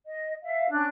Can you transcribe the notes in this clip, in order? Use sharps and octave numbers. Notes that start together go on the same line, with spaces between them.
D#5
E5 F5
C#4 D4 F#6